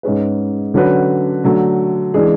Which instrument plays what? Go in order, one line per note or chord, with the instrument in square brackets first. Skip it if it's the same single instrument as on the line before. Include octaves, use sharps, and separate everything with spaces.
[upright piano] G#2 G#3 C#4 G#4 B4
D3 F#3 C#4 F#4 B4
D3 F#3 A3
E3 G#3 D4 G#4